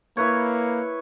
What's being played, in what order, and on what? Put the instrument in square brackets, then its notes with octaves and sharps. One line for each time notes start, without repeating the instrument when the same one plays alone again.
[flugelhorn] A#3 [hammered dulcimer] E4 B4 C#5